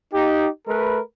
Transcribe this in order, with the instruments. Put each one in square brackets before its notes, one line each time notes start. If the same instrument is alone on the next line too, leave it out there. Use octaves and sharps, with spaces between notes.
[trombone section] D#4 G4
A3 A#4 B4